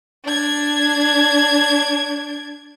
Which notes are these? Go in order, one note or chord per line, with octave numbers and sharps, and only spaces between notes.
D4 G#6